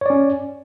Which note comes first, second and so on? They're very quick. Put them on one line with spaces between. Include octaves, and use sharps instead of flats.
C#5 D5 C#4